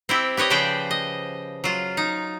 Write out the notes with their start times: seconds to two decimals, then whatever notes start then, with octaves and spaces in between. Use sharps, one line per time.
0.09 C4 E4 G4
0.37 G4 B4 C#5 D#5
0.50 C#3 F3 B4 C5 D5 G5
0.91 D#5
1.64 F#3 F4
1.97 D#4